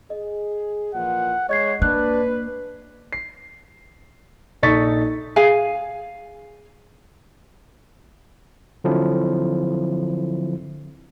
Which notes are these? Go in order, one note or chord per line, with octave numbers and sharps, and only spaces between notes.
G#4 D#5
A#2 E3 F3 F#5
G#3 C#5 D#5 G#6 C7
A#3 D4 B4 F#6
C7
A#1 D#4 A4 C#6 A6 B6
G#4 F5 G#5
D3 F3 F#3 C4 E4